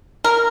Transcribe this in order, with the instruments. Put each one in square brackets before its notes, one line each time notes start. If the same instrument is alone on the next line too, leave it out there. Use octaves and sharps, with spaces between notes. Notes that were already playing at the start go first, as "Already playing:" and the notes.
[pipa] A#4